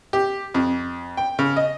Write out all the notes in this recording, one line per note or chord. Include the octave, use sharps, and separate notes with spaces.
G4
F2
G5
C#3
D#5